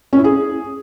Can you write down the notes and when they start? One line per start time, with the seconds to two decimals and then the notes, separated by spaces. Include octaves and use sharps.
0.13 C#4
0.19 E4
0.24 G#4